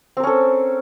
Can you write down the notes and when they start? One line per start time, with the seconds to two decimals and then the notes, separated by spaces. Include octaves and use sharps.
0.17 C4
0.20 A#4
0.23 C#4
0.27 A4